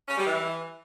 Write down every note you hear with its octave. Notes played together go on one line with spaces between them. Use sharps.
C#4
G3
E3